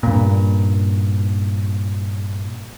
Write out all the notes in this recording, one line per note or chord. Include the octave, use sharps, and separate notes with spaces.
G2 A#2